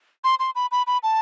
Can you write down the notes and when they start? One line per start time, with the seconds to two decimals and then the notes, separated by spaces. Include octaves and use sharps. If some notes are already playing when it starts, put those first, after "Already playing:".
0.24 C6
0.39 C6
0.55 B5
0.71 B5
0.87 B5
1.03 A5